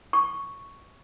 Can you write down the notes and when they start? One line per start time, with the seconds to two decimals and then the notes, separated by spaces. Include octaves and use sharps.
0.13 C#6